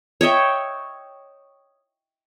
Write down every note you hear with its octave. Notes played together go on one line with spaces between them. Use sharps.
C#5 D#5 E5 G5